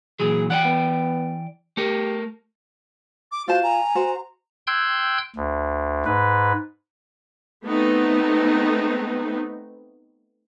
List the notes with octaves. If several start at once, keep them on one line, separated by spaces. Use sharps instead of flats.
A#2 E3 F#3 G#4
E3 D5 F#5 G5
B3
A3 G4 A#4
D6
F4 F#4 C5 A5
G#5 A#5
F#4 C5
G5 C6 E6 F#6 G#6
D2
G#2 B4
A3 B3 C4 D#4